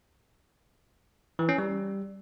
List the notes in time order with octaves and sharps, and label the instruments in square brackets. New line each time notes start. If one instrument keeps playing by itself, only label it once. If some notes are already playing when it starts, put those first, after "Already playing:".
[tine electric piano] E3
C#4
G3